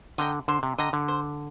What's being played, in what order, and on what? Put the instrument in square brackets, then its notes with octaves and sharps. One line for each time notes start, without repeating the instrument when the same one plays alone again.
[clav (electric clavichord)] D3 [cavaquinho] D#5 G5 A#5
[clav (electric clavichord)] D3 [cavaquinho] C5
[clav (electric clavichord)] C3
[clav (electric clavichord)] D3 [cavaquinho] D#5 G5 A#5
[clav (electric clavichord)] D3
[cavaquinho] C5